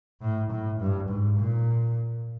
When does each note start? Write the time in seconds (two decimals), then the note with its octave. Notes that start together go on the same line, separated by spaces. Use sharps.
0.22 A2
0.51 A2
0.80 G2
1.09 G#2
1.38 A#2